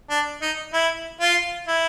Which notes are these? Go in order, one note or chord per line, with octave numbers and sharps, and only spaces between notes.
D4
D#4
E4
F4
E4